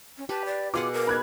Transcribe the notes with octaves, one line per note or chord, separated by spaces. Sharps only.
C#4
G4 B4 A5
D5
B2 F4 G#4 F#5 D6
A#4
B5 F#6 G#6